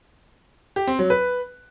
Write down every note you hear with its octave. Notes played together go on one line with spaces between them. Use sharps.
G4
C4
F#3
B4